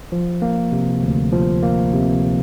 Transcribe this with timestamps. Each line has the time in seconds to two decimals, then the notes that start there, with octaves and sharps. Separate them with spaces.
0.12 F3
0.42 A#3
0.72 C3
1.03 D2
1.33 F3
1.63 A#3
1.93 C3